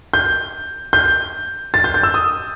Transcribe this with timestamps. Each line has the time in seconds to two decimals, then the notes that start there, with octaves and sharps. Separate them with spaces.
0.14 G6
0.93 G6
1.74 A6
1.84 G6
1.94 G6
2.03 E6
2.14 D#6